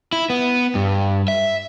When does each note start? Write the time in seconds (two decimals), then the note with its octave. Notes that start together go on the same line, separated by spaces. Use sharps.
0.13 E4
0.30 B3
0.75 G2
1.28 E5